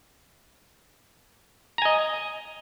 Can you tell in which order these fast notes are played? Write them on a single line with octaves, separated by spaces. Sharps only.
A#5 G#5 D#5